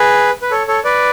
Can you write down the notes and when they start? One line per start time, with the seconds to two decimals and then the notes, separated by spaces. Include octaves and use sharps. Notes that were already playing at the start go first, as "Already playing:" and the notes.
Already playing: G#4 B4
0.42 B4
0.51 A4 C#5
0.68 A4 C#5
0.85 B4 D5